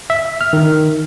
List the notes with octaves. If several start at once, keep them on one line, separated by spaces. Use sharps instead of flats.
E5
F6
D#3